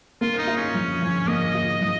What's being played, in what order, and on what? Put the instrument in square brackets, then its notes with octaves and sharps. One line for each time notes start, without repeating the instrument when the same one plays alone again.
[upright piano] A#3 [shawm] F4
[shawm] D#4
[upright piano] F4
[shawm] C#4
[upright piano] F3
F3
[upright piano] A#3 [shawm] D#5
[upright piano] F4
F3